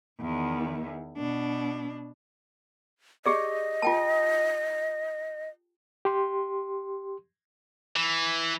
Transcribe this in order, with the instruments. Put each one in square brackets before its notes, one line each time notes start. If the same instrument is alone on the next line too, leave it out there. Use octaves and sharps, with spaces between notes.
[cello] E2 D#3
B2 D4
[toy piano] G4 G#4 D5 [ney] D#5
[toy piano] F4 G5 A5
[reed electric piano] G4 C6
[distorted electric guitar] E3